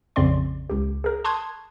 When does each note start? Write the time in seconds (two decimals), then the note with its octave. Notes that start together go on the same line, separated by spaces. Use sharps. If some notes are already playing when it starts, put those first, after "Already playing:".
0.16 A#1 F2 C#3 C4 D5 C6
0.70 C#2 G4
1.04 G#4 A#4
1.24 A5 C6 C#6 D#6 F#6 G#6